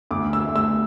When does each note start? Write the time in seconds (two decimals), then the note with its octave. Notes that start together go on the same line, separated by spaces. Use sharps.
0.11 D2 D6
0.33 E6
0.45 A3
0.56 E6